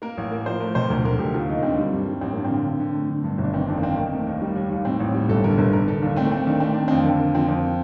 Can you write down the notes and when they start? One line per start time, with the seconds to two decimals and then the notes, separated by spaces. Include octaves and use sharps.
0.02 A#3 A#4
0.17 A1
0.32 A#3
0.46 F3 C5
0.60 A3 A#4
0.75 C3 C5
0.90 D2 A#4
1.05 D2 A#4
1.14 A4
1.19 D2 G4
1.33 D#2 F4
1.49 D#2 D#4
1.58 A#3
1.63 D3 C4
1.79 G3
1.93 G2
2.07 G3
2.21 A1 C4
2.33 G2 A#3
2.44 C4
2.51 D3
2.66 D3
2.80 D3
2.95 A3
3.10 D3
3.24 G2
3.38 G1
3.44 D4
3.53 D#3 C4
3.68 F2 D4
3.77 A#3
3.82 D#3 C4
3.97 D#3 A#3
4.13 A3
4.27 D#2
4.42 G3
4.55 D#2
4.70 D#2
4.85 A2 C4
5.00 A1
5.14 G3
5.29 G1 A4
5.44 D3 A#4
5.58 G1 A#4
5.73 D3 A#4
5.88 D3 A4
6.02 D#2 D4
6.16 A3 C4
6.26 A#3
6.31 A3 C4
6.46 D#3 D4
6.60 A3 C4
6.74 A3 D4
6.88 F2 C4
7.05 D3 A#3
7.19 D3 A#3
7.34 F3 C4
7.48 F2